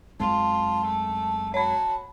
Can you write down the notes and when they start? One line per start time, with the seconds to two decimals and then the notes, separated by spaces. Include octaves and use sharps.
0.20 F#2 G#3 C4 F4 A5
0.85 A3
1.54 F#4 C#5 A5 B5